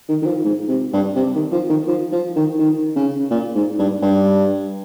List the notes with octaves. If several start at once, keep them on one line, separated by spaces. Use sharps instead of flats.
D#3
D#3
F3
G#2
C3
G2
C3
D#3
F3
D#3
F3
F3
D#3
D#3
C#3
A#2
G#2
G2
G2